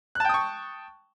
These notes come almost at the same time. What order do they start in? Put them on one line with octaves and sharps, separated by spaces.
F#6 A5 G5 D#6 C#6